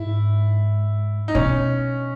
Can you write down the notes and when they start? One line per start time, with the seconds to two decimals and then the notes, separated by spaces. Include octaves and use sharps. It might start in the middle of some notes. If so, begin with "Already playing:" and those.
Already playing: G#2 E4
1.28 D#4
1.35 B2 C#4